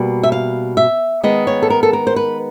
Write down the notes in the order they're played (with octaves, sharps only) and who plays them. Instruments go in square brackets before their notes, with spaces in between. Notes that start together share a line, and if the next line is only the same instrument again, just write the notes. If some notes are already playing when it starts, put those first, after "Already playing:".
Already playing: [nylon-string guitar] B2 G3 A#3
E5
F5
E5
D#3 G#3 B3 D#5
C#5
A4
A#4
A4
A#4
C5
B4